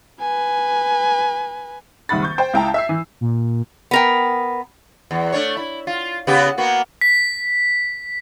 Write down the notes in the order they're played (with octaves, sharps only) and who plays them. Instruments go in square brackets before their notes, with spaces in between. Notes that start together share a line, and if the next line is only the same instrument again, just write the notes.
[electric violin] B4 G#5
[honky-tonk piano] F#1 C2 D#3 F#5 B5 A6
C#6 G6
C5 G5
C#2 E4 G5 A5 A#5
E5 E6 C7
E3
[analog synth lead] A#2
[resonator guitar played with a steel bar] B3 A#4 G5
[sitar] E2
A3 D4 C#5
E4
F4
C#3 B3 G4
A#3 B3 F#4
[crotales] B6